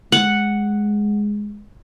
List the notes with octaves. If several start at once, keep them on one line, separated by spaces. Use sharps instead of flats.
G#3 F#5